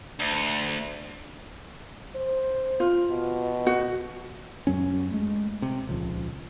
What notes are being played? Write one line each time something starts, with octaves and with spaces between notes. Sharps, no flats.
D2
C5
F4
B2
F#4
F#2 F#3 C#4
G#3 A3
C3
D#1 C#2 F3